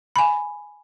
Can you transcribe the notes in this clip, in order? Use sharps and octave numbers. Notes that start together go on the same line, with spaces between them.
G#5 B5